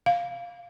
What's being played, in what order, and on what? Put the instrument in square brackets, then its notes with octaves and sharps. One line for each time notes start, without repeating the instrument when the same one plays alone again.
[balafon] F5